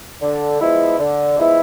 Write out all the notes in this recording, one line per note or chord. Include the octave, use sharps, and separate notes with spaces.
D3
F3 G#3 B3 E4
D3
F3 G#3 B3 E4